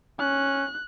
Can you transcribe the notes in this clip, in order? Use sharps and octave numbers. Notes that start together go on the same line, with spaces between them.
C#4 F#6